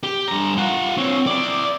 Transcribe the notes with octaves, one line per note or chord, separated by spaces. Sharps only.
G4
G2 A#5
F4 F#5
C4 C#5
E4 D5